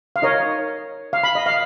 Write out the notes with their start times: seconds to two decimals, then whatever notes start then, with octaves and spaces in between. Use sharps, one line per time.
0.16 F5
0.22 D#4 A#4 C#5 D#5
1.13 F5
1.24 B5
1.35 D#5
1.46 F5